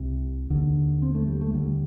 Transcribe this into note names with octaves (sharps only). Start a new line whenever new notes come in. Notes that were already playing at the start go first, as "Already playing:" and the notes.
Already playing: C2 C3
D#2 D3
C4
A3
G3
A3
D#2 D3 G3